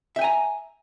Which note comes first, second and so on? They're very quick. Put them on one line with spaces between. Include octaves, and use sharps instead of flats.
E5 G5 G#5 A#5